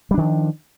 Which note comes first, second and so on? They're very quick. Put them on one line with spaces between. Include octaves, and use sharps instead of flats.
G3 D4 D#3 F3